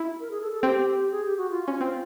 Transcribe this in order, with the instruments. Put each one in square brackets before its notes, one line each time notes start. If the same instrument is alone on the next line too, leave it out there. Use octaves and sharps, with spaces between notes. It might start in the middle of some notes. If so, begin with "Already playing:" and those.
Already playing: [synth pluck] E4
[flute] A#4
G#4
A4
A4
[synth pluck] C4 [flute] G4
[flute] G#4
G4
F#4
F4
[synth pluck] C#4
C4